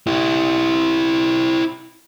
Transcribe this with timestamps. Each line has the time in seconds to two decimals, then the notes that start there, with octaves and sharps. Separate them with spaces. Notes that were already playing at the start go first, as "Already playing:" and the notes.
0.07 E4 G4